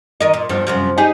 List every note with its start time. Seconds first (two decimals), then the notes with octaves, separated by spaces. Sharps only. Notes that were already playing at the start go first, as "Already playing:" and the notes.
0.21 D#3 A#4 D#5
0.34 A#2
0.49 E2 G2 F3
0.67 F#2 C3 F3
0.98 D#4 G4 G#4